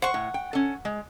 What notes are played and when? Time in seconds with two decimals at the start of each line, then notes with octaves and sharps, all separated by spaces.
0.02 C5 F#5 C#6
0.14 A2
0.34 G5
0.53 C#4 A4
0.85 G#3